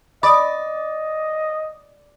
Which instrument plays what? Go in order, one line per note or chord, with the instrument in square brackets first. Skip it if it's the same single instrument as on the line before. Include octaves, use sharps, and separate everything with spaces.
[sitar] D5 [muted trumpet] D#5 [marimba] B5 D#6